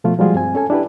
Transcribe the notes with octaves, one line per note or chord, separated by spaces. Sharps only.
B2 F3 A3 F4
F3 G3 G#3 F4 F#4 G#4
G2 C4 G#5
C#4 A4 G#5
D4 E4 G4 B4